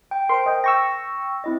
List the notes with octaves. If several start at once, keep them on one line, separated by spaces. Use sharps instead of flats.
G5
A#4 C5 C6 D7
D#5 G5
G5 C#6 E6 A#6
C4 E4 D#5